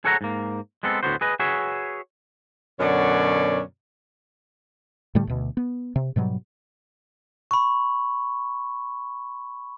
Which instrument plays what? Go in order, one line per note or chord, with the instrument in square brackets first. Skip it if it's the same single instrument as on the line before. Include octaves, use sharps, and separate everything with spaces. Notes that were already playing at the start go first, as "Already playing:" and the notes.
[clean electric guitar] G#4 A4 C#5 F#5 G5 A#5
G#2 A#3
G#3 B3 C4 A4
D2 A2 B3 F#4 C5
G#4 B4 D#5
F#4 G#4 B4 C#5 E5
[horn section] F#2 B2 D3 C#5 D5
[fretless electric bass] A2 D3 G3 A3
D2 B2
B3
C3
G#2 B2 F#3 G3
[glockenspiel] B5 C#6